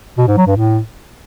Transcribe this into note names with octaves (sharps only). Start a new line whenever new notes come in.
B2
G#2
F#3
G2
A2